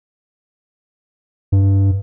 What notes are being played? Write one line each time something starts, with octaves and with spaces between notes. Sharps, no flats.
G2